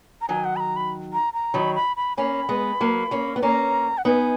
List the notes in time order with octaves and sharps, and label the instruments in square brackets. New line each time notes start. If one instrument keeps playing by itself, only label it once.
[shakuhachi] A#5
[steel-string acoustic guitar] D#3 F#3 [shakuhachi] G#5
[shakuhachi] F#5
B5
A#5
B5
A#5
A#5
[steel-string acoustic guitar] D#3 F#3 [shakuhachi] B5
[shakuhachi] B5
B5
[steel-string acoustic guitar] A#3 C#4 [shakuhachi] B5
[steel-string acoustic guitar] G#3 B3
F#3 A#3
A#3 C#4
B3
[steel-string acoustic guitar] A#3 C#4 [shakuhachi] A#5
[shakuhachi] F#5
[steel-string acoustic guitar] B3 D#4 [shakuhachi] G#5